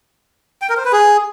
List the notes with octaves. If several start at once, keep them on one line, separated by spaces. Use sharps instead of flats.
G5
A#4
C5
B4
G#4